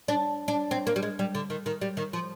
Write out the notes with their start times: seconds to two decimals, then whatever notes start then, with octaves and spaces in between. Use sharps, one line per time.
0.08 D4
0.48 D4
0.71 C4
0.87 A#3
0.96 G3
1.03 G#3
1.19 G3
1.35 D3
1.50 D#3
1.66 D#3
1.81 G3
1.97 D#3
2.13 F3